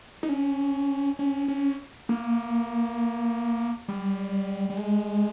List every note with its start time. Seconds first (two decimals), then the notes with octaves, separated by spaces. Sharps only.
0.23 D#4
0.29 C#4
1.19 C#4
1.48 C#4
2.09 A#3
3.88 G3
4.70 G3
4.77 G#3